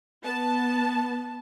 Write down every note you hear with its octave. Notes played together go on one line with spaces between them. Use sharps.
B3 A5